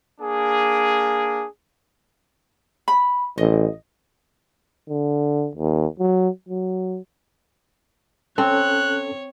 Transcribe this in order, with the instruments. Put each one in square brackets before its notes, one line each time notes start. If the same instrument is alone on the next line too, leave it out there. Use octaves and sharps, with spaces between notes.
[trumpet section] A#3 D4 G#4
[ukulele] B5
[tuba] A1 [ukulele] D#5
[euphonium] D3
D#2
F#3
F#3
[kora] C4 [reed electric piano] C#4 A4 [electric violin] C#5 [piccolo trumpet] F#6